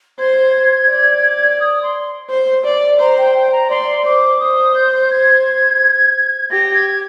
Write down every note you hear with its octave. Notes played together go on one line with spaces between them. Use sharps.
C5 G#6
D5
D#6
C6
C5
D5
C5 A#5
G5
G5
A#5
D5 C6
C5 D6
C5 D#6
G6
G#6
G4 A#6
G#6